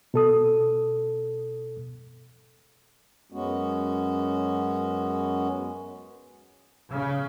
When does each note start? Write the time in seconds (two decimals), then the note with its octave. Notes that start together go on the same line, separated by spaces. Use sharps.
0.14 B2 A4 D#6
3.32 F#2 G#3 B3 C#4 F#4
6.91 C#3